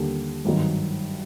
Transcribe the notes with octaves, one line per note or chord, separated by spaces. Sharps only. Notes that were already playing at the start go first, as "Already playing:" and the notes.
Already playing: D#2 D3 G3 A#3
G#1 G2 D#3 F#3